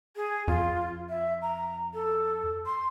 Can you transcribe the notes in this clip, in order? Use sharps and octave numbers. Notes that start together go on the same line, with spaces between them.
G#4
F2 F4
E5
A#5
A4
C6